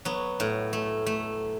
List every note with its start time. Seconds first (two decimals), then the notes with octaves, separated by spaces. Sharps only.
0.05 F#3 B3
0.40 A2
0.73 A3
1.06 A3